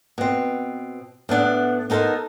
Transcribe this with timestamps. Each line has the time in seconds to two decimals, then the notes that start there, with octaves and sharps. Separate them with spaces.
0.18 B2 C4
1.29 A2 B3 D4 F#5
1.90 B3 D#4 A4 A#4 C5